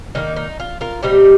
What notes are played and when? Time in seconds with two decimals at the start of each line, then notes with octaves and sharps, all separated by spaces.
0.15 D#3 G3 A#3 D#4
0.36 D#4
0.60 F4
0.81 F4 A#4
1.03 A#2 G3 C4 D#4 G4